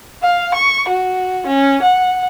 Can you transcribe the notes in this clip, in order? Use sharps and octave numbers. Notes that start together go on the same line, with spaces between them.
F5
C#6
F#4
C#4
F#5